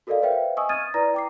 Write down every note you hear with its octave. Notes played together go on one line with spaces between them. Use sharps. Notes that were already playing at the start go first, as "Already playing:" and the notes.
F#4 A4 A#4 D5 D#5 F5
B4 C5 E5 F5 G5
D#5 G#5 C#6 D#6 E6
D#6 F6 G#6 A6 D#7
E4 B4 D5 A#5 A#6
G5 D6 C7